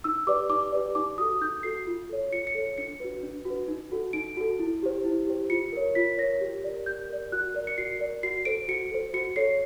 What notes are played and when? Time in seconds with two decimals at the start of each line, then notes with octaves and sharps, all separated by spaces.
0.04 D#4 E6
0.27 G4 B4 D5 D6
0.49 D#4 D6
0.72 G4 B4 D5
0.95 D#4 D6
1.18 F#4 A4 D#6
1.41 D#4 G6
1.63 F#4 A4 C7
1.87 F4
2.10 A4 C#5
2.31 F4 C#7
2.47 C#7
2.55 A4 C#5
2.78 D4 C#7
3.00 F#4 B4
3.23 D4
3.45 F#4 B4
3.68 D#4
3.92 F#4 A4
4.13 D#4 D7
4.37 F#4 A4
4.59 E4
4.83 G4 C5
5.04 E4
5.27 G4 C5
5.50 F4 C#7
5.73 A#4 C#5
5.95 F4 B6
6.18 A#4 C#5 A#6
6.41 G4
6.64 A#4 D5
6.86 G4 G6
7.10 A#4 D5
7.32 F#4 F#6
7.54 A#4 D5
7.67 C#7
7.78 F#4 C7
8.00 A#4 D5
8.23 F#4 C7
8.45 A4 C5 D7
8.68 F#4 C#7
8.92 A4 C5
9.14 F#4 C#7
9.36 A4 C#5 C7